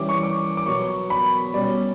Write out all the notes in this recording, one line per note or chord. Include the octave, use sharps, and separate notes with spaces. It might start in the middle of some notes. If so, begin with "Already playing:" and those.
Already playing: E3 G3 C#4 D6
C#6
D6
D6
B2 F#3 B3 C#6
B5
B2 G3 C#4 D5